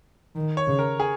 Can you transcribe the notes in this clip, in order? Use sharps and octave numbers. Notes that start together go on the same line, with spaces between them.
D#3
C#5
C#3
A#4
G#4